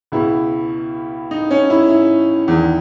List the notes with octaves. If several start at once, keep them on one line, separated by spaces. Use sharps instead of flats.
C#2 B2 E4
D#4
C#4
E4
E4
E2 D#3